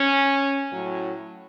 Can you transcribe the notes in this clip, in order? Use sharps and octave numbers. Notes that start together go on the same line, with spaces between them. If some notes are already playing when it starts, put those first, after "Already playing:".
Already playing: C#4
A2 F#3